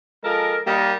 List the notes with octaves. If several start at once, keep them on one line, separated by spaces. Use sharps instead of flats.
F3 G#3 A4 A#4
G3 A#3 D#4